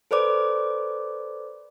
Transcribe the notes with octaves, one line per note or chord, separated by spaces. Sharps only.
A4 B4 C5 D5 D6